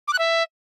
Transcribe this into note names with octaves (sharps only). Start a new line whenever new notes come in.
D6
F#6
E5